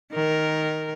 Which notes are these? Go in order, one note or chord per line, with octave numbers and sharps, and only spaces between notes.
D#3 A#4